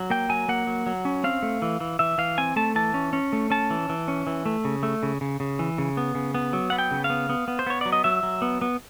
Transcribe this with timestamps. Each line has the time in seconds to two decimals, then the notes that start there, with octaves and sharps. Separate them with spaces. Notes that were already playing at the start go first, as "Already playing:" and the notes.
Already playing: F#3
0.10 A#3 G5
0.29 F#3 G#5
0.48 A#3 F#5
0.67 F#3
0.86 F#3
1.05 C#4
1.24 C4 F5
1.42 A3
1.62 E3
1.80 E3
1.99 E3 E5
2.18 E3 F5
2.38 C4 G#5
2.56 A3 A5
2.76 E3 A5
2.94 C#4
3.13 C#4
3.33 A3
3.50 C#4 A5
3.70 E3
3.89 E3
4.08 C#4
4.27 E3
4.46 A3
4.65 C#3
4.83 A3
5.03 C#3
5.21 C#3
5.40 C#3
5.59 E3
5.78 C#3
5.97 B3
6.15 C#3
6.34 B3
6.53 F#3
6.70 B3 F#5
6.78 G5
6.91 C#3
7.04 F5
7.10 B3
7.29 B3
7.48 B3
7.59 C5
7.67 B3 C#5
7.81 F#3 D5
7.92 D#5
8.04 F#3 E5
8.23 F#3
8.42 B3
8.62 B3